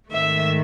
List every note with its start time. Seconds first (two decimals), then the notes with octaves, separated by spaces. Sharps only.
0.10 G#2 D#3 A3 E5